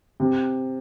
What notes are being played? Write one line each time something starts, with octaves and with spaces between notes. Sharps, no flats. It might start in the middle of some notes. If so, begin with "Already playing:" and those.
C3